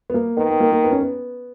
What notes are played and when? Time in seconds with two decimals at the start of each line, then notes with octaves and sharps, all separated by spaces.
0.10 B3
0.14 A#3
0.37 D#3 B3
0.49 B3
0.60 A#3
0.72 A#3
0.84 B3
0.92 C#4
1.01 B3